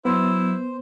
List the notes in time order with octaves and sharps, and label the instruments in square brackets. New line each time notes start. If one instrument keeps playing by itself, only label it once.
[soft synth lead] F#3 [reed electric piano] B3 [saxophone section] E4 [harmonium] C5